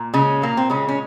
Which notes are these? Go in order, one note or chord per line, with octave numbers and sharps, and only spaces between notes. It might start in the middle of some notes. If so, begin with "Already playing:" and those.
Already playing: A#2
C#3 G#3 C#4
A#2 A#3
C4
C#3 G#3 C#4
C#4